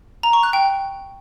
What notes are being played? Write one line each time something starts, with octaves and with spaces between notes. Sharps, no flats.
A#5
C#6
F#6
G5